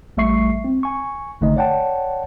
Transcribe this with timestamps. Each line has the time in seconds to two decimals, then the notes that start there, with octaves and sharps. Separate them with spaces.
0.17 A1 G3 A3 E5 C#6 C7
0.64 C4
0.83 G#5 C#6
1.41 G#1 D3 A3 D#4 D#5
1.56 C#5 D5 F#5 G5 A5